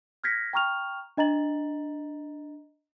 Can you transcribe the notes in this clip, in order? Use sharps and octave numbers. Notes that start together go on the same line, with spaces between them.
F6 G6 G#6 A#6 B6 C#7
G5 A#5 C#6 F6 F7
D4 D#5 A#5 A6 F#7